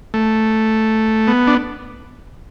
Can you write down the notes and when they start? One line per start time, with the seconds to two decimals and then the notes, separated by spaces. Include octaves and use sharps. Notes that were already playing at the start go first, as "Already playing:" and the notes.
0.14 A3
1.27 B3
1.47 D4